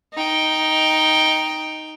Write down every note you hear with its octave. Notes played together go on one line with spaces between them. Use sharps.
D#4 G5